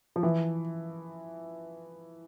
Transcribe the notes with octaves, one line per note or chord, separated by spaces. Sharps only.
F3
E3